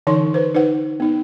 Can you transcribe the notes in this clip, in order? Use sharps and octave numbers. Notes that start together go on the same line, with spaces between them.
D3 E3 D#4 C#5 C6 C#6
B4 C5
D#4 B4 C5 F#5
B3 D#4